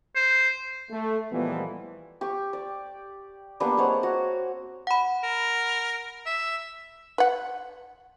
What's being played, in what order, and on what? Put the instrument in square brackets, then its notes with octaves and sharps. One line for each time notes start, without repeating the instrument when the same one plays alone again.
[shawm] C5
[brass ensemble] A3
A#2 E3 F3 G3 G#3 B3
[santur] G4 C#6
D5
G3 A#3 B3 D4
G#3 C4 C#5 F#5
F#4
[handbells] F#5 B5
[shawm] A#4
E5
[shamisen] B4 F#5